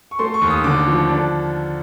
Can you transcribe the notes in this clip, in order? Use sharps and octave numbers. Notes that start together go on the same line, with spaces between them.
C#6
A3 C6
C#6
D#2
D#6
D3 D6
F3
D4